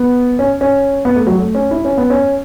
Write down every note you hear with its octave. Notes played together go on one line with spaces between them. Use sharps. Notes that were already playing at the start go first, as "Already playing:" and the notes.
Already playing: B3
C#4
C#4
B3
A3
F#3
A3
C#4
E4
C#4
B3
C#4